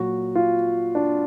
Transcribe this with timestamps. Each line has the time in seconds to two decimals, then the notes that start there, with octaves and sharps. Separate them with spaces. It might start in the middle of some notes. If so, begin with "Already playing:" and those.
Already playing: A#2 F#3 F#4
0.35 F4
0.95 D4